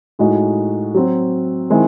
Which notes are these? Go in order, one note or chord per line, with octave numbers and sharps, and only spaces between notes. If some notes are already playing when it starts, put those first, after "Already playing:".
A2 G#3 D#4 F#4
F#3 C4 F#4
D#3 G#3 C4 E4